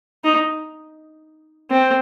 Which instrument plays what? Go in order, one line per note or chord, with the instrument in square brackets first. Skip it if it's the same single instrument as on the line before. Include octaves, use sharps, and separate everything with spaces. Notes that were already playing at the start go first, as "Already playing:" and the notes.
[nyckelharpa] D#4
C4